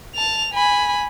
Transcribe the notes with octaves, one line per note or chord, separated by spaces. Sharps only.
A5 F7
G#5 B5